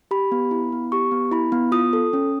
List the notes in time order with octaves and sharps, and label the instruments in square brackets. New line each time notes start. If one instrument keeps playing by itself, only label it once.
[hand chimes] G4 B5
B3
E4
B3
G4 C#6
B3
E4 B5
B3
F4 D#6
A4
C#4